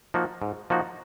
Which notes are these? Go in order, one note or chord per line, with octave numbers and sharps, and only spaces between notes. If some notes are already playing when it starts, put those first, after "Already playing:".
F3 A#3 D#4 F#4
G#2
F3 A#3 D#4 F#4